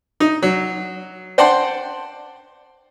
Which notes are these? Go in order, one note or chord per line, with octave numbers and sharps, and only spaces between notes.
D#4
F#3
C5 D5 F#5 G5 A5 C6